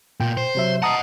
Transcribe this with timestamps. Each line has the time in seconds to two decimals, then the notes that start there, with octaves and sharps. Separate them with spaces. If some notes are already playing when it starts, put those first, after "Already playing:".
0.20 A#2 G5
0.37 C5
0.55 C3 F#3 E5
0.82 D#5 F#5 A5 A#5 D#6